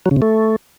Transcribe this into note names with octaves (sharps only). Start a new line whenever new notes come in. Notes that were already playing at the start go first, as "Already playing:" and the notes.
F#3
C#3
C3
A3